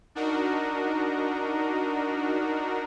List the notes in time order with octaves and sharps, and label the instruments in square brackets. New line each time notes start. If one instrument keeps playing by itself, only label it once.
[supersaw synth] D4 D#4 F#4 A#4